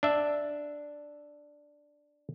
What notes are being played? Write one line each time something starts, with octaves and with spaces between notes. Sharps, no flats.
D4 E5